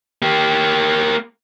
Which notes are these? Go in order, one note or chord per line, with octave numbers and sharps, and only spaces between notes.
A#3 G4